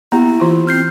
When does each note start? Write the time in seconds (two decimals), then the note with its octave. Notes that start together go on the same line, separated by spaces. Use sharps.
0.12 A#3 B3 E4 G4 A#5
0.40 E3 F4
0.67 C4 F6 G6 C7